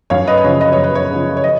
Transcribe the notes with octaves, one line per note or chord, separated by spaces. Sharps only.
F#2 C#5 F5
B4 D#5
B4
C#3 F3 C#5
D#5
F#2 C#5
B4
C#5
C#3 F3
C#5
D#5